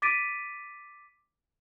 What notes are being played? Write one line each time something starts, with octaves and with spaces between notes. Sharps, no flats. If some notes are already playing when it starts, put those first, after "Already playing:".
D6 A6 B6 D7 D#7